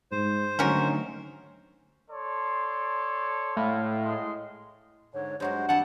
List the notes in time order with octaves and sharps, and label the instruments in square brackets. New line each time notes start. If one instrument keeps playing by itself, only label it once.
[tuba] G#2 [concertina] C5
[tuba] D3 [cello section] D#3 F#3 A3 [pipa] C#4 F#4 A#4
[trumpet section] A4 C#5 D5 [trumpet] C6
[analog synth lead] A2 [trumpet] F5
[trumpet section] G#3 D#5 C6
[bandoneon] G#2 D3 [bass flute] C#5
[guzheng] G2 F#3 F#4 [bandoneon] G#3 C5 [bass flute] C#5
[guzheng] E3 G3 C4 [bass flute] D4 [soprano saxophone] F#5 [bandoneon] A5